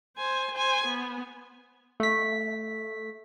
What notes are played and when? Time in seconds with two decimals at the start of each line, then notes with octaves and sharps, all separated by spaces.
0.18 C5 G#5
0.54 C5 G#5
0.87 B3
2.00 A3 B6